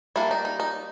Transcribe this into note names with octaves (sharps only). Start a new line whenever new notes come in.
G3 A#3 D4 E4
D#4
D#4
D#4